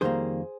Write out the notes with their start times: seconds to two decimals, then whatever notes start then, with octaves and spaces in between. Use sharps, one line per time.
0.01 F2 D#3 G3 A#3 G#4 C5